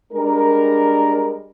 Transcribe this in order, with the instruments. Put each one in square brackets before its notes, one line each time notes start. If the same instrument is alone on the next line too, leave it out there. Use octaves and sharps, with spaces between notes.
[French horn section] G3 G#3 D4 A#4